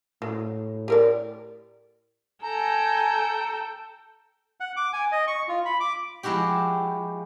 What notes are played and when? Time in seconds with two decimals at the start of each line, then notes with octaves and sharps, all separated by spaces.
0.22 A2 F#3
0.88 G4 A#4 D5
2.43 A4 G5 G#5 A#5
4.60 F#5
4.76 D6
4.93 G#5
5.12 D#5
5.28 C#6
5.48 F4
5.65 B5
5.80 D6
6.23 F3 G#3 E4 F#4 G4